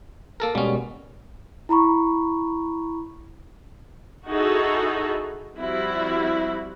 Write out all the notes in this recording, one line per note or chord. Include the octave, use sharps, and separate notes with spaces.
A#3 A4 A#4
B2 G3 G#3 A#3 C#4
E4 A#5 B5 C#6
D#4 E4 F#4 G#4 A4
F3 G3 C4 E4 F#4